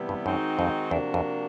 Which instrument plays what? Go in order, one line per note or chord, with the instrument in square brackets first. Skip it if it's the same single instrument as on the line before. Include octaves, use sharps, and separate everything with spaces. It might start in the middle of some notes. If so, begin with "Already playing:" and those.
Already playing: [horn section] C3 E3 G3 B3 E4
[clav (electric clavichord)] G2
[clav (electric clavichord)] F#2 [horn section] D#3 G#3 C4 D#4 F#4
[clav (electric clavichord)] F2
[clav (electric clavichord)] E2 [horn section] C3 F3 A#3 D4 F#4
[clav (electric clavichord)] F2